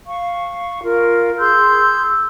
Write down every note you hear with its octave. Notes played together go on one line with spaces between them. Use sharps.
F5 C#6
F4 A#4
G#4 C6 E6 G6